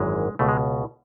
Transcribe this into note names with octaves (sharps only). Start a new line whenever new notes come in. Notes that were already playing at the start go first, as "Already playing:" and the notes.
Already playing: G#1 F#2 E3 G#3
C#2 B2 A3
G#3